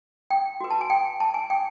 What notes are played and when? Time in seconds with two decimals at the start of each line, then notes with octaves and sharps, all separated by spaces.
0.30 G5
0.61 F#4 B4
0.70 A5
0.81 G#5
0.90 G5
1.20 A5
1.34 G#5
1.50 G5